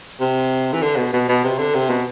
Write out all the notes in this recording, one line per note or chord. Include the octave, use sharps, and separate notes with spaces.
C3
E3
D3
B2
B2
B2
C3
D3
C3
B2